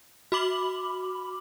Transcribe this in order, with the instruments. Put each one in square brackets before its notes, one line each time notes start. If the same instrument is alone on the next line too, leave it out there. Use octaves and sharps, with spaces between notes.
[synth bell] F#4 B5 D6 F#7